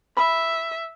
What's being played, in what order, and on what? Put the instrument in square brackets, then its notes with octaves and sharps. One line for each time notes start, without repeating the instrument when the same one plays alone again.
[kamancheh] E5 [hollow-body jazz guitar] B5